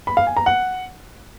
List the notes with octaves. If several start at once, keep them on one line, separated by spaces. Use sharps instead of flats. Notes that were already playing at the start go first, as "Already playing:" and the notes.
B5
F5
G#5
A#5
F#5